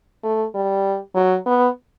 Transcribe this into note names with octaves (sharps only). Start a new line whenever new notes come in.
A3
G3
F#3
B3